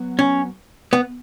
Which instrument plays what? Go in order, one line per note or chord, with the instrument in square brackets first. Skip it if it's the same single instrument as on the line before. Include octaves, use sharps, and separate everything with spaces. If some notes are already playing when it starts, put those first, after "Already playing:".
Already playing: [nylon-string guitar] F#3 B3
[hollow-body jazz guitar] C#4
B3